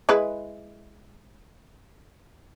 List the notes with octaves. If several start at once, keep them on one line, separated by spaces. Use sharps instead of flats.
G#3 E4 B4